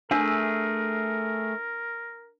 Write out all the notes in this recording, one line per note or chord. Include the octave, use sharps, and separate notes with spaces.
A3 D4 G#4 A#4 E5